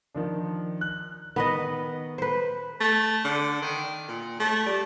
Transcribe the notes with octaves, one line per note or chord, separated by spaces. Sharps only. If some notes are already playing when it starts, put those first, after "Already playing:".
D#3 F3 D4
F#6
D#3 B3 B4 D#5
B4 C5
A3
D3
D#3
A#2
A3
G3